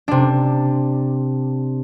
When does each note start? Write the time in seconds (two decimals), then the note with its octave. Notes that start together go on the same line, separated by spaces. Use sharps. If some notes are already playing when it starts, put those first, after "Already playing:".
0.08 C3 D4